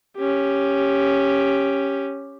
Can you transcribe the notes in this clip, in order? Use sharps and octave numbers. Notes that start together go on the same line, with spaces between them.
C#4 G4